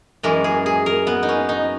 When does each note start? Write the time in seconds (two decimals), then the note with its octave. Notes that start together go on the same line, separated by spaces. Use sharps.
0.23 F#2 E3 G#3 A#4
0.44 G#4
0.66 G#4
0.86 A#4
1.07 B3
1.23 D#4
1.29 C#4
1.49 D#4